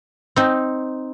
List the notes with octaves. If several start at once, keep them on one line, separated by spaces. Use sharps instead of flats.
C4 D#4